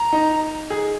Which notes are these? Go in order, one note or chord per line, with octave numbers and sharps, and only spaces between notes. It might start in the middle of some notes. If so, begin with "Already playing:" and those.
Already playing: A#5
D#4
G#4